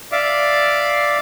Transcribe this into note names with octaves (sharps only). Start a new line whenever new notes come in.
D5 E5 F5 D6